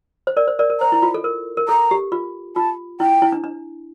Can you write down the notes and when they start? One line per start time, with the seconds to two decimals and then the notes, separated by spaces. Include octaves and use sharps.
0.27 C5
0.37 A#4 D5
0.48 C5
0.59 A#4 D5
0.70 A#4
0.80 C5 A#5
0.92 E4
1.02 F4
1.14 A4
1.24 A#4
1.57 A#4
1.68 A4 A#5
1.91 G4
2.12 F4
2.56 F4 A5
3.00 E4 G5
3.22 E4
3.32 D4
3.44 D4